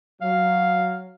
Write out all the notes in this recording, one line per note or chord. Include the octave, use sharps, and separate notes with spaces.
F#3 F5